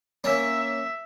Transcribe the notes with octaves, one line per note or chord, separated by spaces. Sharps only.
A#3 C#4 E5